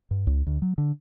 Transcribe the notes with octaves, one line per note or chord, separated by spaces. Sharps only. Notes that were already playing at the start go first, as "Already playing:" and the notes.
G2
C#2
D2
F#3
D3